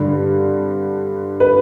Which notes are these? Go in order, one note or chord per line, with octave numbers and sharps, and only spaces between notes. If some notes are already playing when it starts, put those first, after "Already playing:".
Already playing: G2 D3
B4